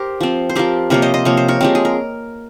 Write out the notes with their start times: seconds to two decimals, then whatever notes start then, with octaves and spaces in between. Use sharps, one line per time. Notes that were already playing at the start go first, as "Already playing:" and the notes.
Already playing: G4 A#4 C5
0.21 F3 C4
0.49 C5
0.56 F3 C4 G4 A#4
0.90 C3 F3 A#3 A#4 C#5
1.02 C5 D#5
1.14 C5 D#5
1.25 C3 F3 A#3 C#5
1.37 C5
1.48 A#4 C#5
1.61 F3 G#3 C4 G4
1.75 G#4
1.85 A#4